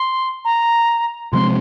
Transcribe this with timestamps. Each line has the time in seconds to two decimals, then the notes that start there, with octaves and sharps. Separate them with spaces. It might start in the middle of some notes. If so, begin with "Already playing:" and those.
Already playing: C6
0.45 A#5
1.33 C3 F3 G#3 C4 C6